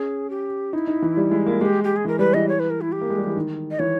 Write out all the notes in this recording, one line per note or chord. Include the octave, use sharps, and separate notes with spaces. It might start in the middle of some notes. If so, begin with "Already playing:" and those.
Already playing: C#4 G#4
G4
D#4 E4
D#4
E3
G3
G#3
A#3
G#3 G4
G4
G#4
E3 A#4
G3 B4
E3 D#5
C#5
B4
A#4
E4
G4
A#3
G#3
G3
E3
D#3
D#5
E3 C#5